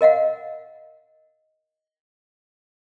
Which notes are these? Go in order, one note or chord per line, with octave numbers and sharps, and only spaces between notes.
A#4 D#5 F5 F#5